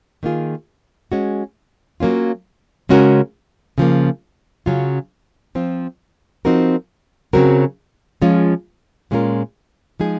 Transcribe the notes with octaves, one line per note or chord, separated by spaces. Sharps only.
D#3 A#3 F4 G#4
G#3 C#4 F#4
F#3 A#3 C#4 F4
C#3 G#3 C#4 F#4 A#4
C#3 F3 A#3
C#3 F#3 C#4 F4
F3 C4 F4
F3 C4 D#4 F#4 A#4
C#3 F#3 C4 F#4 A#4
F3 G#3 C#4 F4
A#2 G#3 C#4 F4 A#4
F3 G#3 D#4 G#4